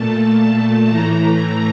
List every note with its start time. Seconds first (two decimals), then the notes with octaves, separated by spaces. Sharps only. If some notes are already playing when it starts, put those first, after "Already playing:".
Already playing: A#2 A3 A5
0.40 A5
0.90 A2 E3 A3 A#5